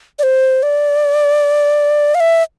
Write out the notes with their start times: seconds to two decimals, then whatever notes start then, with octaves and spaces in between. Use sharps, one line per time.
0.19 D5
0.23 C5
0.63 D5
2.15 F5
2.20 E5